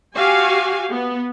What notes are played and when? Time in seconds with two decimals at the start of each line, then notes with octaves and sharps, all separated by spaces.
0.16 F#4 G4 F5 G#5
0.91 B3